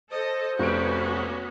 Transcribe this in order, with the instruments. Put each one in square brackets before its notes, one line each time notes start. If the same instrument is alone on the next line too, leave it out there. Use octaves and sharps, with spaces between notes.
[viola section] A4 D#5 [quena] C5
[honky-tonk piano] F1 D7 [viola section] B3 C#4 F#4